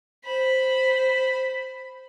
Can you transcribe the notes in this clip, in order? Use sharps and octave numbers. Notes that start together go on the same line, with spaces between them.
C5 B5